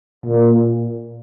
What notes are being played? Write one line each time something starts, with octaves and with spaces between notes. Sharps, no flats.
A#2